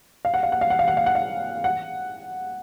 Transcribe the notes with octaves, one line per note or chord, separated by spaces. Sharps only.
F5
F#5
F5
F#5
F5
F#5
F5
F#5
F5
F#5
F5
F#5